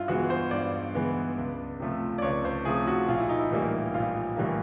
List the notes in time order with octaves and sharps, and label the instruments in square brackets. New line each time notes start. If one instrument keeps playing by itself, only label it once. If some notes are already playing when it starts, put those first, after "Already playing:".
Already playing: [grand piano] G2 E4 F4
E3 G#3 B3 F#4
C5
G2 D5
E3 G#3 B3
C#2
C3 F3 A3
D5
C#2 C#5
C5
C3 F3 A3 G#4
F#4
A#1 F4
E4
D#4
E4
A2 E3 G3 A#3
A#1 F4
A2 E3 G3 A#3